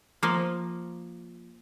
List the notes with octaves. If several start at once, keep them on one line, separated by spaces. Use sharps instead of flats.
F3 A#3